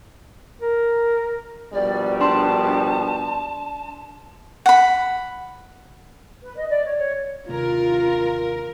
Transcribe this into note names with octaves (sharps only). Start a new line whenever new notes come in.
A#4
A#1 B2 G3 D5
D4 A5 C6
F#5 B5
B4
D#5
D5
C#5
C#5
D#2 C3 A#3 F4 A#4